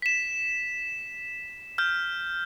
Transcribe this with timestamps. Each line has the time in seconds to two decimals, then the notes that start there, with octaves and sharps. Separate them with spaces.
0.02 B6 E7
1.78 F6 G6